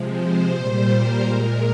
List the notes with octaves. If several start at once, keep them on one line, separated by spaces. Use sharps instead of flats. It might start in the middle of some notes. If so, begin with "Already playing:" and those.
Already playing: C3 F3 G#3
C5
A#2 G3 C5
A#4
A#2 G#3 A#4